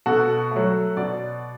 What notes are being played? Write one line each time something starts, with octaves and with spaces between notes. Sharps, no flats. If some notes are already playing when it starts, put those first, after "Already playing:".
B2 F#4 A4
F#3 A3
B2 D5 F#5